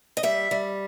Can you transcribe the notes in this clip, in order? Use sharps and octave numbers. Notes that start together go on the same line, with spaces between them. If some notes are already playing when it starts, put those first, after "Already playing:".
D#5
G3 E5
G3